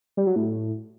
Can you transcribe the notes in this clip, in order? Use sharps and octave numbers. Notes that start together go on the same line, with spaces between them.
G3
F#3
A2